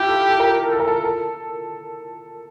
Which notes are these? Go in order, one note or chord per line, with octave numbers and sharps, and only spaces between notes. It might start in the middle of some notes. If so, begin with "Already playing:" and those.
Already playing: E4 F4 G4
A4
A4
A#4
A4
A#4
A4
A4